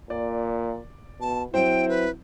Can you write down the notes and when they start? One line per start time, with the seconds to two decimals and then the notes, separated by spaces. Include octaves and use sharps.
0.10 A#2 D5
1.21 B2 A5
1.54 F#3 C4 E4 C5 G5
1.89 B4